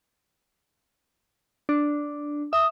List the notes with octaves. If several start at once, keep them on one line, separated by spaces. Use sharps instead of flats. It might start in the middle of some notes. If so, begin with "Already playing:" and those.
D4
E5 D#6